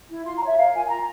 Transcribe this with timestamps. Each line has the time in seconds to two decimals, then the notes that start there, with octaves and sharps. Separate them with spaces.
0.09 E4
0.25 F4 C6
0.37 A#5
0.41 C#5
0.47 E5
0.57 A#4 F5
0.73 F4 G#5
0.85 G#5
0.89 F4 A#5